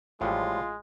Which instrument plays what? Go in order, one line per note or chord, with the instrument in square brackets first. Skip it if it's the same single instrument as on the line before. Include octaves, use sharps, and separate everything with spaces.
[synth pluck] A1 [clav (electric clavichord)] A2 F3 G3 [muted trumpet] G#3 [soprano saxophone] F4